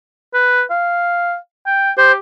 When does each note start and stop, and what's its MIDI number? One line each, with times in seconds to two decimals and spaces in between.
0.34 0.63 71
0.70 1.36 77
1.66 1.91 79
1.97 2.18 67
1.97 2.12 72